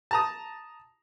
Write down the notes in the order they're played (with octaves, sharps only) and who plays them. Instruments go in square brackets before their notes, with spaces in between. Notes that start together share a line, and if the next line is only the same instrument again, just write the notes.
[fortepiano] A5 A#5 D#6